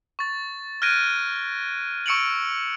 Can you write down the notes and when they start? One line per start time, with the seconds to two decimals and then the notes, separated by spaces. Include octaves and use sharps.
0.19 C#6 A6
0.82 F6 F#6 G#6 A#6 D7 D#7
2.06 C#6 E6 C#7 D7 F7 F#7